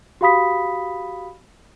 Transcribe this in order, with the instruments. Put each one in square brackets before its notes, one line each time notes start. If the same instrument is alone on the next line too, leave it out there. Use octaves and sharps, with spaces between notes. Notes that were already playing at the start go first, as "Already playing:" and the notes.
[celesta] F#4 G4 F5 B5 D#6 B6